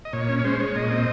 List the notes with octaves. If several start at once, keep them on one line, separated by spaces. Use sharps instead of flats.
D#5
A#2 C#5
C#4
C#5
G#3 C5
G#3 C#5
A#2 D#5
C4